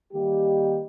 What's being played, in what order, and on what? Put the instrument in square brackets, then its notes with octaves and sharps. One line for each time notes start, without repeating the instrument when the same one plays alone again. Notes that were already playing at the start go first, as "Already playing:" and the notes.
[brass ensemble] D#3 G3 A#3 D#4 G4